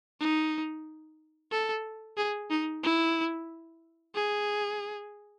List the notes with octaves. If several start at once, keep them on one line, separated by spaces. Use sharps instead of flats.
D#4
A4
G#4
D#4
E4
G#4